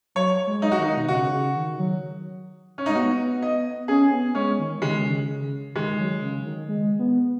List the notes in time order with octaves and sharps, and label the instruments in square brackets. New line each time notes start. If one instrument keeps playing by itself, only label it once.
[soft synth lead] F#3 [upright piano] C#5
[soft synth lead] G#3
[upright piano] D#4
F#4
[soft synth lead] D#3 [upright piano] D#4
[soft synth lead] B2
[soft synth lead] C#3 [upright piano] F#4
[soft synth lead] C#3
D#3
F#3
[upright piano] C#4
[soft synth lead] G#3 [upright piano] D#4
[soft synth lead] B3 [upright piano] F#4
[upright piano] D#5
[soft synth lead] C#4 [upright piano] G#4
[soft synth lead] B3
[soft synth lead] G#3 [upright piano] C#4
[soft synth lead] D#3
[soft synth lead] C#3 [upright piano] G#3
[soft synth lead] D#3
C#3
[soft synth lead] D#3 [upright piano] G#3
[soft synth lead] F#3
C#3
D#3
G#3
B3